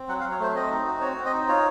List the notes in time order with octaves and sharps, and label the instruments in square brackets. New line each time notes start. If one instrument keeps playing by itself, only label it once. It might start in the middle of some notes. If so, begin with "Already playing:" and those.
Already playing: [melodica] C4
F#3 F#5
F5
F#3
C#5
A3 C5
C4 D#5
D#4
F#4
C4 C#5
C4
D#5
D#4
F4 C#5